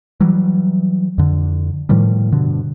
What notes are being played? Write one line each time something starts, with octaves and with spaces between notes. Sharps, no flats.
E3 F#3 G3
F2 D3
A2 D#3 F3 G3
G2 B2 D3